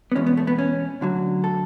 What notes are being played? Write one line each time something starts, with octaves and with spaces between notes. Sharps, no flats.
B3
E2 B2 G#3 C#4
B3
A3
B3
C#4
D2 D3 F#3
A4